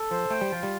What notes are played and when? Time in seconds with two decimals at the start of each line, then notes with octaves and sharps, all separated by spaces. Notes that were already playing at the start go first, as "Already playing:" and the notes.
Already playing: A4
0.11 F3 C5
0.31 A3 G5
0.41 G3
0.50 F3 F4
0.63 G3